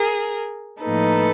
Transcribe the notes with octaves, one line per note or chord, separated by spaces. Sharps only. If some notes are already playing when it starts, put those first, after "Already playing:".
Already playing: G#4 A#4
A2 F3 A#3 D#4 A4 B4